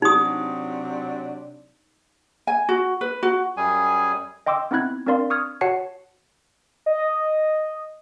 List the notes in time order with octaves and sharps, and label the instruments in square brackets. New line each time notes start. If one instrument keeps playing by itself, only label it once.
[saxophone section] C3 F#3 D4 [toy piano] D#4 D#6
[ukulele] G#5
F#4
B4
F#4
[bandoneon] F#2 G3 G#4 G#5
[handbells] D#5 G5 C6 D6 E6
B3 C4 D#4 E4 F#6 G#6
C4 D4 A#4 D5 F5 C6
C#6 D#6 F6 G#6
F#4 C#5 F#5 A5 C7 C#7
[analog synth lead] D#5